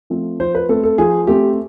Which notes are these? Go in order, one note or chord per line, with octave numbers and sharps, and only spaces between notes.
F3 A3 C4
F3 C5
B4
A3 C4 A4
A4
F3 G#4
A3 C4 G4